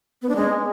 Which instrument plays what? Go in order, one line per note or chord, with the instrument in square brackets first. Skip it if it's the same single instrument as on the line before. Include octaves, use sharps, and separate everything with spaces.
[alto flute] B3
D4
G#3